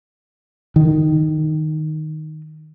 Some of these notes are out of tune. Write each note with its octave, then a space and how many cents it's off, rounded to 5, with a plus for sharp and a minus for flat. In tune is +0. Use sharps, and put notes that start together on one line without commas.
D#3 -5